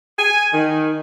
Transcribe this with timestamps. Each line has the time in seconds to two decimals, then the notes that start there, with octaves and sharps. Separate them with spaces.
0.18 G#5
0.54 D#3